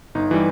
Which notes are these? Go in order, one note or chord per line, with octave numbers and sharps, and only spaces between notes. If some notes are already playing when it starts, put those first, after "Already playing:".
G1 D#4
E3 G3